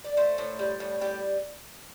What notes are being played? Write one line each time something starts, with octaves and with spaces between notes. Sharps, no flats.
D5
A3 C5
A2
G3
A2
G3 G4